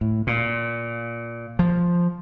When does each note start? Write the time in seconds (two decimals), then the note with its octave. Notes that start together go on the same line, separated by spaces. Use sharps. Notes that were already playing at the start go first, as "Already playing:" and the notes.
0.01 A2
0.27 A#2
1.59 F3